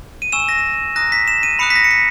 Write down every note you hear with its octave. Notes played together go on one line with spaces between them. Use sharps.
D#7
G#5 C#6 E6 E7
A#6
A#5 D#6 F#6 A#6
B6
E7
D#7
B5 D#6 F#6 C#7
B6
A#6
C#7
B6